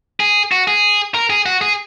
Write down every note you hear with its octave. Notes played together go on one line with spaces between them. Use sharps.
G#4
F#4
G#4
A#4
G#4
F#4
G#4